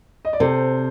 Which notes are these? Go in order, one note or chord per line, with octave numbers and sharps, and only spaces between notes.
D#5
D5
C3 A4 C5